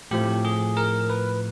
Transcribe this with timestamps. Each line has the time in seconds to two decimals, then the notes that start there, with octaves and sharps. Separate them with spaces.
0.11 A2 F3 A3 C4 G4
0.45 G#4
0.77 A#4
1.10 B4